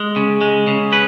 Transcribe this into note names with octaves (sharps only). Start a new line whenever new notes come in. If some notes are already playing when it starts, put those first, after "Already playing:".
Already playing: G#3
C#3
G#3
C#3
C#4 B4